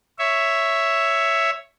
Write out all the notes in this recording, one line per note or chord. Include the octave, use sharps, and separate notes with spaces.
C#5 E5